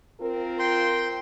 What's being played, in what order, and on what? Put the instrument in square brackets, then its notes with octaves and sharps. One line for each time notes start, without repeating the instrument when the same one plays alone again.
[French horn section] C4 F4 A#4
[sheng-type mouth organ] G5 C6